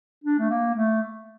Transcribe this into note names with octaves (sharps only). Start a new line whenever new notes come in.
D4
A3
A#3
A3